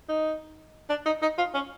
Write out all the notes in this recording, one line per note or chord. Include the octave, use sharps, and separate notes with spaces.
D#4
D4
D#4
D#4
F4
C#4